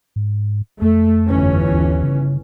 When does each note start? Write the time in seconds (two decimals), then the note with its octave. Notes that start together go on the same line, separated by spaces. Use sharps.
0.16 G#2
0.81 F2 A3
1.29 G1 E3 C#4
1.71 D#2
2.03 C#3